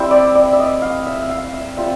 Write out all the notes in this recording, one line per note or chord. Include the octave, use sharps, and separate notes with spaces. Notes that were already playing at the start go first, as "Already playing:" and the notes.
Already playing: G3 C4 E4 E5
D5
D5
E5
D#5
F5
E5
E5
F5
E5
G3 C4 F4 E5